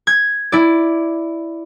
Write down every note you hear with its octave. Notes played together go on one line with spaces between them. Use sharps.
G#6
E4 D5